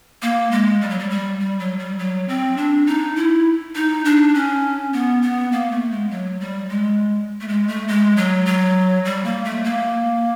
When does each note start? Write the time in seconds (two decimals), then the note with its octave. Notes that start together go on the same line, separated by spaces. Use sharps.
0.22 A#3
0.51 G#3
0.81 G3
0.90 F#3
0.99 G3
1.10 G3
1.40 G3
1.59 F#3
1.79 G3
1.99 F#3
2.28 C4
2.57 D4
2.87 D#4
3.16 E4
3.75 D#4
4.05 D4
4.35 C#4
4.93 B3
5.22 B3
5.52 A#3
5.72 A3
5.91 G#3
6.11 F#3
6.41 G3
6.69 G#3
7.41 A3
7.48 G#3
7.68 A3
7.88 G#3
8.17 F#3
8.46 F#3
9.05 G3
9.25 A#3
9.45 A3
9.64 A#3